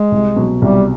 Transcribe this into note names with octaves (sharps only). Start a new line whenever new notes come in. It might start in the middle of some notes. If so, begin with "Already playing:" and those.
Already playing: G#3
C2
B2 F#3
C2 G3